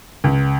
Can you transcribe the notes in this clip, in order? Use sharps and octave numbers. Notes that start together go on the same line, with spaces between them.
C#2